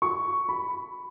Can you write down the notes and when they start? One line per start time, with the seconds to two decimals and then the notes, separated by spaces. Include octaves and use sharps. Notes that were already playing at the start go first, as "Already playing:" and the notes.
0.02 C#6
0.49 B5